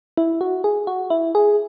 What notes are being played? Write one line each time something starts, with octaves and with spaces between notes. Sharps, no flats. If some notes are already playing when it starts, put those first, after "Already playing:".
E4
F#4
G#4
F#4
E4
G#4